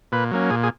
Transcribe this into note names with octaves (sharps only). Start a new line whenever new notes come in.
A#2 B4
F#3 A#3 C#4
A#2 G#4
G#4